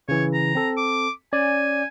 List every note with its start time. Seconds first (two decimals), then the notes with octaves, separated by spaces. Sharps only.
0.09 C#3 E3 C#5
0.34 A#5
0.55 C4 A4
0.77 D6
1.33 C#4 D5 G#5